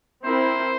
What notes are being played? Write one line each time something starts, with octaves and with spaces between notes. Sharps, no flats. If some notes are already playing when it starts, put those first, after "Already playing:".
C4 E4 A#4 C5